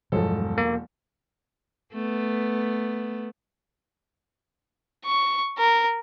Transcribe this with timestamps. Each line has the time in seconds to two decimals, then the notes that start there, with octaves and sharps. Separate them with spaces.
0.12 E1 G2 B2 F3 F#3 G#3 A4
0.58 A#3
1.92 A3 B3
5.05 C#6
5.58 A#4